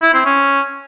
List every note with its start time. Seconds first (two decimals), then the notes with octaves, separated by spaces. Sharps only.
0.02 E4
0.14 C4
0.26 C#4